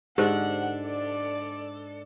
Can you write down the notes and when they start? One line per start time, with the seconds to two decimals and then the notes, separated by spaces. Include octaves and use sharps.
0.18 G#2 D4 G4 A4 C5 F#5
0.87 D5